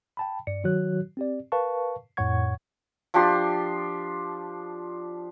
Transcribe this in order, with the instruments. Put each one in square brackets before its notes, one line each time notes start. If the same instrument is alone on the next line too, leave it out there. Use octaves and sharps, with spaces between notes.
[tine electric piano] G5 A5 B5
G2 D5 C#7
D#3 F#3 F#4 C#5 F#6
C4 G4 D5
A#4 B4 F5 A5 C#6
F2 A2 C#5 F#5 C#6 G#6
[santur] F3 D4 G4 C6